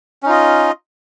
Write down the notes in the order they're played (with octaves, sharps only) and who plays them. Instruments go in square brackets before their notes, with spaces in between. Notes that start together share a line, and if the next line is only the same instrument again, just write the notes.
[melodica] C#4
D#4
F4
D#5